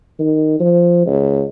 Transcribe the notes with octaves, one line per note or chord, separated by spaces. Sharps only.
D#3
F3
C#2